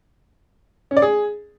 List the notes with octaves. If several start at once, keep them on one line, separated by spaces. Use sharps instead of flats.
C#4
D5
G#4